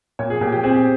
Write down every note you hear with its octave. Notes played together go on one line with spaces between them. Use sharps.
A#2 C#5
G#4
A#2 G4
G4
C4 G#4
G4